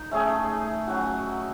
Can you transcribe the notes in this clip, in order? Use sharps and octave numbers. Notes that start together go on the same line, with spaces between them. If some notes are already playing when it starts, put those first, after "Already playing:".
Already playing: D#4
A3 C#4 G#4
F#3 C#4 F#4